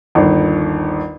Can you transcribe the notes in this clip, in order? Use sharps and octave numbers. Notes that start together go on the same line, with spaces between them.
G1 D#2